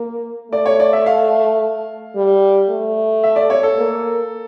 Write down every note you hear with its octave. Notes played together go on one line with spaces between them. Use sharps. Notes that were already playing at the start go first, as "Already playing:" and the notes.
Already playing: A#3
A3 D5
C#5
D5
E5
F5
G3
A3
E5
D5
C#5
A4
A#3